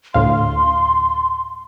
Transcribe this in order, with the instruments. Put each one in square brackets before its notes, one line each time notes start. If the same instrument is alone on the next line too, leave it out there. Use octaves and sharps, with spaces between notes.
[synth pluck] D2 A2 F5 [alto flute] C6